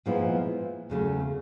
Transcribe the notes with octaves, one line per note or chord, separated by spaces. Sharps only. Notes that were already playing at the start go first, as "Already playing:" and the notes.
A#2 F3 G#3 B3 E4
E2 C#3 F#3 A3